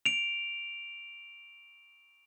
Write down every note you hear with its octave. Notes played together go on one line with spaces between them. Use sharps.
D7 F7